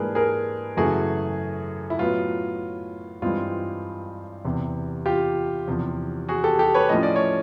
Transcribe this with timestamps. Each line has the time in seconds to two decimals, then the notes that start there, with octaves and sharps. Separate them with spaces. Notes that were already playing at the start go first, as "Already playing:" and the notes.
Already playing: G#2 E3 G3 A#3 D4 G#4 A#4 B4
0.15 G#4 A#4
0.77 F#2 C#3 E3 A3 F#4 G#4
1.90 E4
1.99 A2 F#3 B3 F4
3.22 G2 E3 G#3 C4 F4
4.45 E2 C3 E3
5.06 F4 G4
5.68 E2 C3 F3
6.29 F#4 G#4
6.44 G4 A4
6.59 G4 A4
6.74 B4 C#5
6.89 A2 F3 A3 C#4 D#5
7.03 D5
7.16 C#5